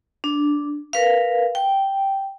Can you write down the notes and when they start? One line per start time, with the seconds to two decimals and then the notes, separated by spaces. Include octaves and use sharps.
0.24 D4
0.93 A#4 B4 F5
1.55 G5